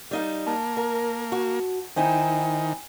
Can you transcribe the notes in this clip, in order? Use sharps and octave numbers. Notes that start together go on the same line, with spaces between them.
G3 D#4 F5
A#3 A5
A#4
F#4
D#3 D#4 E4 C5 G5 G#5